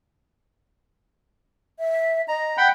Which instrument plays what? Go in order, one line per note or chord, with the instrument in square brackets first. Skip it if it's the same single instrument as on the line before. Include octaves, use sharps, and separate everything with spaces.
[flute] E5
[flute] D#5 [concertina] A#5
[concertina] F#5 G5 B5